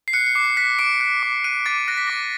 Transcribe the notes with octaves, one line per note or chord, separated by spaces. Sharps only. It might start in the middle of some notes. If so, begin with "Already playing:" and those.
C7
F#6 C#7
C#7
D6 C7
F#6 B6
D6 D7
F#6
D6
F#6 D#7
D6 A6
F#6 A#6
B6
D6 A#6